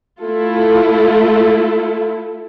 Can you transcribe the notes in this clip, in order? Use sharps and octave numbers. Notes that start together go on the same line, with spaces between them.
A3 E4 F4 A4